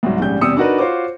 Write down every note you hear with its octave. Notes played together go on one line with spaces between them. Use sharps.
C2 G#2 F#3
A#1 G#2 C#3 G3 G6
E2 C3 G3 D#6 E6 C#7
D4 D#4 F#4 A#4 B4
F4 F#4 C5 C#5 D6